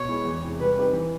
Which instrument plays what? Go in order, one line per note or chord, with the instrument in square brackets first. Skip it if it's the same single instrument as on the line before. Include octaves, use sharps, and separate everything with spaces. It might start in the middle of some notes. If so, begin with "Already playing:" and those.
Already playing: [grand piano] B2 [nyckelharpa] C#5
[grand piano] G#3 B3 E4
E2
C3 E3 G#3
[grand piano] G3 [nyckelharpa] B4
[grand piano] C4 D#4 G4
E3